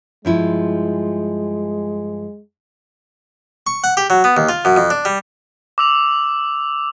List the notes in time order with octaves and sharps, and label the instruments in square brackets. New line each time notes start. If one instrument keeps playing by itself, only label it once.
[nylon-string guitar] G2 F3 E4 [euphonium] G#3
[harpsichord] C#6
F#5
G4
F#3
B3
D#2
F4
F#2
F2
D4
G3
[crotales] D6 E6 F7